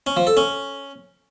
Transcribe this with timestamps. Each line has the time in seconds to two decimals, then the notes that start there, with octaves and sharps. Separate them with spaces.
0.07 C#4
0.17 F3
0.27 A4
0.37 C#4